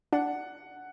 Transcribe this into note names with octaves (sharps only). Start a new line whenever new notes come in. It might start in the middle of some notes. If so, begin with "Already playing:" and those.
D4 F#5